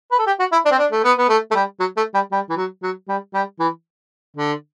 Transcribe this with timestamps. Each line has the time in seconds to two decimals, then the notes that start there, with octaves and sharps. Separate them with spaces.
0.11 B4
0.19 A4
0.26 G4
0.39 F#4
0.52 E4
0.65 D4
0.71 C4
0.78 D4
0.91 A3
1.04 B3
1.18 B3
1.29 A3
1.51 A3
1.55 G3
1.80 F#3
1.97 A3
2.14 G3
2.32 G3
2.49 E3
2.57 F#3
2.82 F#3
3.08 G3
3.34 G3
3.59 E3
4.37 D3